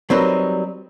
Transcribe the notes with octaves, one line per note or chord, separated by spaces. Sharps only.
F#3 G3 C4 D#4 A#4 B4